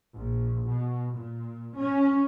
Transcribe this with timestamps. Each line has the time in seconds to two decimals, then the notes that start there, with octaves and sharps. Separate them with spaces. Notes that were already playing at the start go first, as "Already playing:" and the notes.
0.15 A#1
0.68 B2
1.15 A#2
1.77 C#4